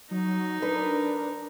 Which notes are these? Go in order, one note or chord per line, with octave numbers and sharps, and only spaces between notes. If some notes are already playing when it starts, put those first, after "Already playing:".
F#3 D#4
D4 A#4 B4